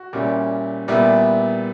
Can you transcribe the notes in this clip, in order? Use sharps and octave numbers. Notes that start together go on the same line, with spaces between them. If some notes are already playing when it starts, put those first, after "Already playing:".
Already playing: F#4
A#2 G3 C#4 E4
A#2 G3 B3 E4